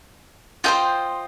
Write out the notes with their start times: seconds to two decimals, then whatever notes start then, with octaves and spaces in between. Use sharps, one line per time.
0.64 F4 G#4 C5 D#5 G5